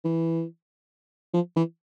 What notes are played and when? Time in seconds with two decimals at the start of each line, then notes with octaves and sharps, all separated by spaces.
0.05 E3
1.34 F3
1.56 E3